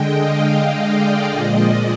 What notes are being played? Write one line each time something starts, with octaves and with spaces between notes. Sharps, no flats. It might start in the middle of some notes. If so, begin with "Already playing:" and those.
Already playing: D3 G#3 D#5 G5
F5
D#5
D5
A#2 F3 G#3 D#5
D5